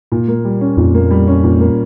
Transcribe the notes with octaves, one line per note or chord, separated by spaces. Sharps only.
A#2
A#3
G3
C#4
F2 A#2
A#3
G3
C#4
A#2
A#3